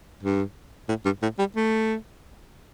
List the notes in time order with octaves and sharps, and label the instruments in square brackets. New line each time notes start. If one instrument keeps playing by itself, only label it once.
[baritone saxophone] G2
A2
G2
A2
G3
A3